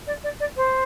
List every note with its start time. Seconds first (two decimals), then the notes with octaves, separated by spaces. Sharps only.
0.07 D5
0.24 D5
0.40 D5
0.57 C5